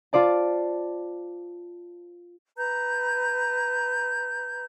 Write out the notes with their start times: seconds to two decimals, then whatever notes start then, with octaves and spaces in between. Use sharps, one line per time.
0.13 F4 C5 D5 A5
2.57 B4 A#5 G6